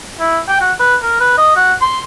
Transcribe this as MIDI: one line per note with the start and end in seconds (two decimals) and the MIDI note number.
0.20 0.38 64
0.48 0.58 79
0.61 0.72 66
0.79 0.96 71
1.02 1.19 70
1.20 1.35 71
1.38 1.55 75
1.56 1.73 66
1.81 2.01 84